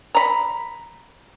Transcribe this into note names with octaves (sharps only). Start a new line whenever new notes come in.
A#5 B5